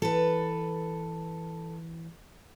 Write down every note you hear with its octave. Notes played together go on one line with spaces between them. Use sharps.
E3 A4 B4